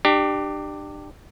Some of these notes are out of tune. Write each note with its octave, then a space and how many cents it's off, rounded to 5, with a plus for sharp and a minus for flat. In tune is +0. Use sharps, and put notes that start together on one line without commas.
D4 +35 G4 +0